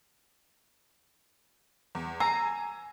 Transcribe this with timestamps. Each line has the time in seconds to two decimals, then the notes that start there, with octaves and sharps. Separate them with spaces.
1.95 E2
2.20 G#5 A#5 E6 C7